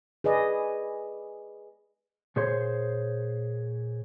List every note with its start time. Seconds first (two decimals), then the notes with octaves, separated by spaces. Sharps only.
0.24 G#4 B4 D5 D#5
2.36 A#2 G#4 C5 C#5 C6